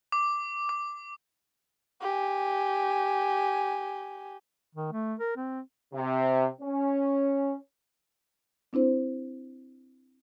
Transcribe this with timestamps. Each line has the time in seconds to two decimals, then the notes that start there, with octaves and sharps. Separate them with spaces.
0.12 D6
0.69 D6
2.02 G4 G#5
4.75 D#3
4.92 A3
5.20 A#4
5.36 C4
5.94 C3
6.61 C#4
8.73 C4 D4 E4 C5